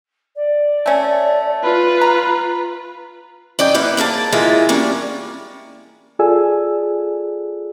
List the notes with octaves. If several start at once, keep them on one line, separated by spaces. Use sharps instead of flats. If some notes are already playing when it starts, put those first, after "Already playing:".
D5
A3 C#4
F4 B4 B5
A#5
F#2 D5 D#5 G5
A#3 E4 B4 F#5
G#2 A#3 B4 A5
E3 G#3 A#3 F4 E5
G3 A#3 C#4 D4
F4 G#4 A4 D5 G#5 E6